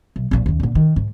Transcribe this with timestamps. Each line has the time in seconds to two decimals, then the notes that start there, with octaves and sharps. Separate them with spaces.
0.16 B1
0.31 A#1 A#2
0.46 D#2 C#3
0.60 A#2 D3
0.75 D#3
0.96 G#2